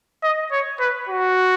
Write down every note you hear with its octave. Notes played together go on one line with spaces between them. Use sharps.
D#5
C#5
B4
F#4